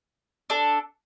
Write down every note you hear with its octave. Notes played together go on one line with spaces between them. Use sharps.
D4 A4